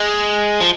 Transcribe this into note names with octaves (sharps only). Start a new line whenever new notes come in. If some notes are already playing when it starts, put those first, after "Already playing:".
Already playing: G#3
F3